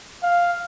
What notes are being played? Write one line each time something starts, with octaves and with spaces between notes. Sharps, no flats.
F5